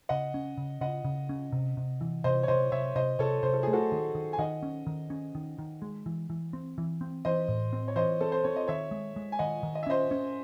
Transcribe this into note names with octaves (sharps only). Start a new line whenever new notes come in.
C#3 D#5 F#5
C#4
C#3
C#3 D#5 F#5
C#3
C#4
C3
C3
E3
C3 C5 D#5
C#5
C3 C5 D#5
C3 C#5 E5
C3 C5 D#5
C3 A4 C#5
C3 C5
A4
A3 G#4
F#4 A4
D#3
D#3
G#5
D#3 D#5 F#5
C#4
D#3
C#4
D#3
D#3
G#3
E3
E3
C4
E3
C4
E3 C5 D#5
A2
C4
C#5
E3 C5 D#5
C4 A4
C5
C4 C#5
D#5
D#3 C#5 E5
G#3
G#3
G#5
D#3 D#5 F#5
D#3
D#5
E5
C#4 C5 D#5
C#4